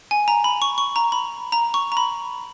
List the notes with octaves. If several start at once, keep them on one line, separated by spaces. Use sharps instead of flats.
G#5
A#5
B5
C#6
C#6
A#5
B5
A#5
C#6
A#5
B5